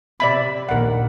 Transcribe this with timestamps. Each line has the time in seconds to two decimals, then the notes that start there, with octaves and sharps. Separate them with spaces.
0.20 C3 D5 E5 B5
0.69 A#1 D#2 A#4 F#5